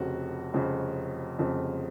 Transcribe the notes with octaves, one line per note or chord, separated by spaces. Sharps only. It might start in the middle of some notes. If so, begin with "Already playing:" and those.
Already playing: F1 F2 C#3 F#4
F1 F2 C#3
F1 F2 C#3